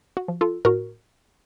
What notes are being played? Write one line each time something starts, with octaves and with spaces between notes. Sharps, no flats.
F#4
F3
F4 A4
A2 F#4 A#4